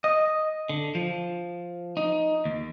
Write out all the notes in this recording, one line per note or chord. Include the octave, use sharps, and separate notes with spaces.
D#5
D3
F3
D#4
D#2